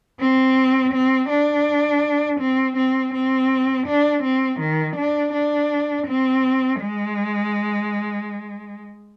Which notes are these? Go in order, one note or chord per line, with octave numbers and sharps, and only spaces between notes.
C4
C4
D4
C4
C4
C4
D4
C4
D#3
D4
D4
C4
G#3